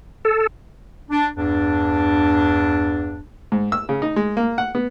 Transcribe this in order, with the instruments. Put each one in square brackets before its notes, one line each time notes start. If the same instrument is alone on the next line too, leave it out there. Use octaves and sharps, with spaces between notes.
[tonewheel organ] A4
[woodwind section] D4
E2 G2 D4
[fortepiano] G#2
E6
C#3
D#4
G#3
A#3
F#5
B3